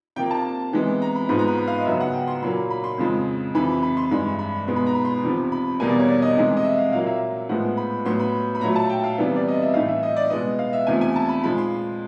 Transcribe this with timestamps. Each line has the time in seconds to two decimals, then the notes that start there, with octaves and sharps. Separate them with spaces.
0.16 C3 F3 A#3 G5
0.31 A5
0.73 C3 E3 G#3 B3
1.02 A#5
1.16 B5
1.29 G#2 F3 G#3 B3 B5
1.39 A#5
1.48 B5
1.58 B5
1.68 F5
1.77 D#5
1.85 F#2 C#3 F#3 B3 E5
2.00 F#5
2.13 G5
2.28 C6
2.42 A#2 F#3 A#3 B5
2.70 B5
2.84 C6
2.98 F2 C#3 F3 G#3
3.55 F2 C3 E3 B5
3.83 B5
3.97 C6
4.11 G2 E3 G#3 B5
4.39 B5
4.68 B2 G#3 B3 C6
4.76 B5
4.86 A#5
4.95 B5
5.05 C6
5.14 B5
5.23 E2 C3 F3
5.52 B5
5.80 E2 B2 G3 A#3 G#5
5.89 D5
5.99 C#5
6.09 D5
6.22 D#5
6.36 C3 E3 G#3
6.57 D#5
6.64 E5
6.78 F5
6.93 A#2 F#3 A#3 F5
7.06 E5
7.49 A2 F3 G#3 B3 F#5
7.77 B5
8.05 A2 F#3 B3 C6
8.20 B5
8.55 B5
8.61 A#2 F#3 A3 A#5
8.76 A5
8.89 G5
9.04 F5
9.18 C3 E3 G3 B3
9.36 D5
9.48 D#5
9.62 E5
9.74 A2 E3 A3 F5
9.88 E5
10.03 D#5
10.17 D5
10.30 B2 G#3 B3 D#5
10.59 F5
10.73 E5
10.87 E2 C3 F3 A3 G#5
11.01 G#5
11.16 A5
11.29 B5
11.43 A#2 F3 G#3 B5
11.58 C6